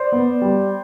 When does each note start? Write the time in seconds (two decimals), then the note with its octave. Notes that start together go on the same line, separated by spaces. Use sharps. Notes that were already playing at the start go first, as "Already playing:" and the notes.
Already playing: C5 D5
0.12 B3
0.42 G3